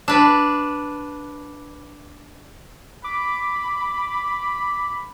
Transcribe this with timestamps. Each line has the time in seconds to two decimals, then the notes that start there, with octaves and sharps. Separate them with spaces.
0.08 D4 B4
3.04 B5 D6